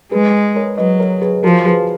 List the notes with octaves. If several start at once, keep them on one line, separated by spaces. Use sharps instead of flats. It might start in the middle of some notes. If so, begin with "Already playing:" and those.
G#3 G#4 B4
A#4 C#5
F#3 B4 D#5
A#4 C#5
G#4 B4
F3 F#4 A#4
G#4 B4